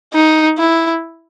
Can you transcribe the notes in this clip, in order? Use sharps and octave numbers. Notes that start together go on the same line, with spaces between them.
D#4
E4